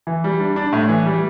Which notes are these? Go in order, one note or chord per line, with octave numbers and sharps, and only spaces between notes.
E3
G3
D4
D4
A2
E3
G3